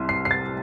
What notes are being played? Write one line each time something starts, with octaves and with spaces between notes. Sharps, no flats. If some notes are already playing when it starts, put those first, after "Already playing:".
Already playing: C2 C3 C6
C7
C7
A6